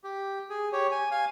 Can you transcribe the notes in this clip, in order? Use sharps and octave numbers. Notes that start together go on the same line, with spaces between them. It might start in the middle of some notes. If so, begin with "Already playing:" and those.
G4
G#4
G4 C#5
G#5
F5 G#5